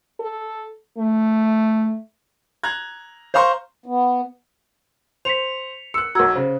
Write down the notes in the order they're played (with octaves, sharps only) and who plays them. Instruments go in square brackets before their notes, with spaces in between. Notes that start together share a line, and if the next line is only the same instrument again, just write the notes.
[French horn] A4
A3
[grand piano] A#5 F#6 G#6
C5 F5 A#5 C6 C#6
[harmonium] B3
[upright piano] C5 [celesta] B6 C#7 F7
[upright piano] E6 F#6 [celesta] C#7
[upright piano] B1 F#4 [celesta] A#5 E6 G#6
[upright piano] C#3 [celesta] C5